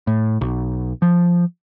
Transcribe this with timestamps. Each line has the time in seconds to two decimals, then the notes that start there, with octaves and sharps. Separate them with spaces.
0.07 A2
0.41 B1
1.02 F3